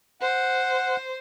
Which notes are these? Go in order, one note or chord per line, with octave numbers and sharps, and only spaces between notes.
C5 F#5